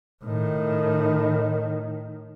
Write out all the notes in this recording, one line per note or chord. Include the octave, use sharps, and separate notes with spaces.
A2 D#3